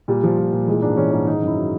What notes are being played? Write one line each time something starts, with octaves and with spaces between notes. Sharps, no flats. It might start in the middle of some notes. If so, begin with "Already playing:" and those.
A#2 G3
F3
A#2
A#2
E3 G#3
G#2 D4
E3 C#4
G#2 D4
D#3 D#4
F#2
E4
F#3